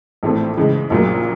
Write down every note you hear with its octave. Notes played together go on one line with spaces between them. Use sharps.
A#1 A2 E3 A3 C4
C#3 E3 G#3
A#1 A#2 F#3 A#3